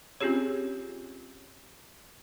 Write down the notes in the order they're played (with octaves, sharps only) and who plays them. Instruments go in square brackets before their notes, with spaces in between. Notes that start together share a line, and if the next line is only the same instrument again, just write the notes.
[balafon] C4 C#4 F4 G4 G#4 C#5